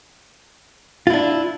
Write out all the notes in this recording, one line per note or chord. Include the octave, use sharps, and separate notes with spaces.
D4 E4 F4